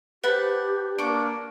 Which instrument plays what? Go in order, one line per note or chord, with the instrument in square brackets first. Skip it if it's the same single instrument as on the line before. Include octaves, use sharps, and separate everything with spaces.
[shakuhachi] G4 [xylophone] B4 C5 [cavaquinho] F#5 A5 B5
[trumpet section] A#3 D4 [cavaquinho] C#6 D6